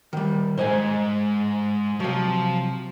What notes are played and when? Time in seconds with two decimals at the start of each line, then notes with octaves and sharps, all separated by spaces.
0.13 D#3 G3
0.58 B1 G#2 C5 D#5 G#5
2.00 C3 F3 F#3